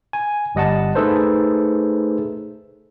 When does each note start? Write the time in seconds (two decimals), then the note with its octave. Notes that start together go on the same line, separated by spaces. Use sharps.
0.13 G#5
0.55 G1 G3 D#5 F#5 A5
0.95 A3 D#4 G#4 A4 B4 C5